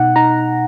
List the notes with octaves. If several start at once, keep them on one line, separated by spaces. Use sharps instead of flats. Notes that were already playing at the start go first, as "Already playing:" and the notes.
Already playing: B2 D#4 F#5
D#4 A#5